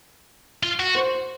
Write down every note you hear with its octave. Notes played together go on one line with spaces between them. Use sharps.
F4
F#4
C5